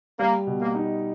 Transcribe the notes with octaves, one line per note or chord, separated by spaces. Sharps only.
G3 A#3
B2
A#3
D#4